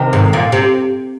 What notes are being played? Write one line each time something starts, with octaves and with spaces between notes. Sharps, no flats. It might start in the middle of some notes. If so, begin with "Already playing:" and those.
Already playing: C3 D#3
G#2
A#2
C3